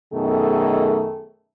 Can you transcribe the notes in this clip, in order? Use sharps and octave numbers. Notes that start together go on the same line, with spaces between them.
F#2 B2 D#3 A3 G#4 A4